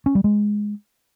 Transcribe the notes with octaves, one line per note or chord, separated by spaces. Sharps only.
C#4
G3
G#3